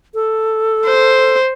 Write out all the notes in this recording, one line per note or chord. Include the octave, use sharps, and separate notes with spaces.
A4
C5